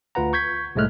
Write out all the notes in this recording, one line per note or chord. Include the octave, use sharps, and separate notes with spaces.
D2 F4 B4 F#5 A#5
C#6 G6 G#6 B6
C2 A2 G#3 A3 F6 F#6